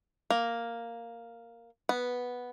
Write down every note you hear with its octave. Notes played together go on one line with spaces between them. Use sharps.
A#3
B3